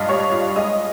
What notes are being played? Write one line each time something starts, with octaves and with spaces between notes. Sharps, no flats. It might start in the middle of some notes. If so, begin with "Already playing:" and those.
Already playing: G2 F4 D#5 F5 D#6 F6
G3 C#5 C#6
F4
G#3 D#5 D#6